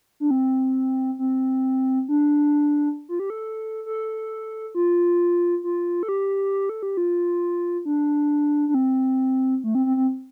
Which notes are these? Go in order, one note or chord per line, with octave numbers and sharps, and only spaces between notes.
D4
C4
C4
D4
F4
G4
A4
A4
F4
F4
A4
G4
A4
G4
F4
D4
D4
C4
A3
C4
C4
C4